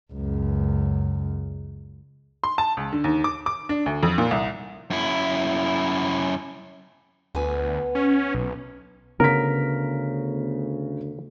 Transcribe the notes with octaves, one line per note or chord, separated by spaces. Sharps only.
C#2 F#2
C6
A5
C#2
D3
D#2
D6
D6
D4
D2
F2
A#2
C2
F#2 E4
D2 B3 B4 G#5
C#4
B1
D2 C#3 B3 A#4 B6